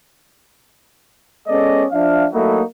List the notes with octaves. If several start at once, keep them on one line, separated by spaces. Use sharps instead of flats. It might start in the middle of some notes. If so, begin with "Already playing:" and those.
G#3 B3 C#4 A4 D5 D#5
F3 D4 E5 F5
F#3 A3 A#3 D#4 E4 F#4